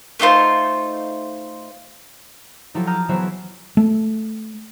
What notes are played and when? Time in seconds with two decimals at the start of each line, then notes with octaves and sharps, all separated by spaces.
0.19 A3 D#4 F4 C5
2.75 F3 F#3 E4 G4 A4
2.87 A5 A#5 D#6 F6 G6
3.09 E3 F#3 B3 G#4 C5 E5
3.77 A3